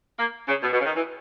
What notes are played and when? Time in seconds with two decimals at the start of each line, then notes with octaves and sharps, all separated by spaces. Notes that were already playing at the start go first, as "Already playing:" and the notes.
0.19 A#3
0.48 C#3
0.63 B2
0.73 B2
0.80 C#3
0.85 D#3
0.96 E3